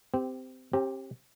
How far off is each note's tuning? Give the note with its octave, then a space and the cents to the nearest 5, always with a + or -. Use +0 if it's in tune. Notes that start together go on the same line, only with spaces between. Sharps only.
C4 -20 G4 +0
C4 +40 G4 +0 A#5 +0